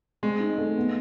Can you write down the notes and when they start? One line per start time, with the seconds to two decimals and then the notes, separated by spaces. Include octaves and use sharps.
0.23 G#3 C4
0.40 D#4
0.58 A3
0.76 B3